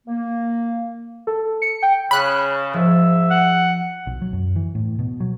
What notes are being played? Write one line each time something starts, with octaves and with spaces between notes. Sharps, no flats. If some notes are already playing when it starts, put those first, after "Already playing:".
A#3
A4
C#7
G5
C#3 B5 C#6 D#6 F#6
G#2 F3 E5
F#5
B1
F#3
F#2
E3
A2
B2
F#3